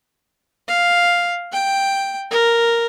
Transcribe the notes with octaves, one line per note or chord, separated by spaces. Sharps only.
F5
G5
A#4